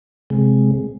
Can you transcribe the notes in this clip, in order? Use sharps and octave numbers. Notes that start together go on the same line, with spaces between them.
C3 G#3